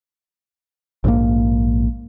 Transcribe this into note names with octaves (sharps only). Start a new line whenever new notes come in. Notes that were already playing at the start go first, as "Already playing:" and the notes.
A#1 G#2 D3 A#3